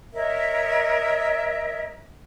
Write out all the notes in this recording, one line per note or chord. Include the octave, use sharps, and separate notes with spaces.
A#4 C#5 D#5 E5